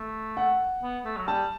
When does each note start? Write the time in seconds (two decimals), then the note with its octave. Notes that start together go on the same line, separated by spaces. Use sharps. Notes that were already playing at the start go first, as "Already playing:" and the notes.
Already playing: A3
0.37 F#5
0.82 B3
1.05 A3
1.17 F#3
1.27 G3 A5